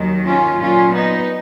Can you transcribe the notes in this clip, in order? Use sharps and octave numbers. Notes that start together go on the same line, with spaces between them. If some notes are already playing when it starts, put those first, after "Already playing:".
Already playing: D#2 D#3 F#3
C#4 F4
A#2 F#3 C#4 F4
B3 D#4